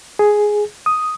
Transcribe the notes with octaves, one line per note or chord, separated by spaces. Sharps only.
G#4
D#6